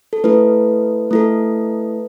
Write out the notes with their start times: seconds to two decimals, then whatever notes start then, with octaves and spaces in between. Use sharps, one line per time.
0.13 A4
0.24 A3 E4 A4 B4
1.11 A3 E4 A4